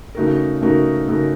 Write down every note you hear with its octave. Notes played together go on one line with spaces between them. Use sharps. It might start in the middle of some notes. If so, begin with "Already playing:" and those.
C#3 A3 D#4 F#4 A#4
C#3 A3 D#4 F#4 A#4
C#3 A3 D#4 F#4 A#4